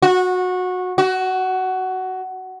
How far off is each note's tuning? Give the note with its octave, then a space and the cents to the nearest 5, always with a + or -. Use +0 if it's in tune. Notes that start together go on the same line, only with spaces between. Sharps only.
F#4 -20
F#4 +15